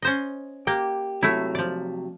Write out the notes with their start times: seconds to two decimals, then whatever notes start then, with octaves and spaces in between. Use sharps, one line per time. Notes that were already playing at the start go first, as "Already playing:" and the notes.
0.02 C#4 C5 D#5
0.67 A#3 G4 G5
1.23 C3 F#3 A3 E4
1.55 F3 D5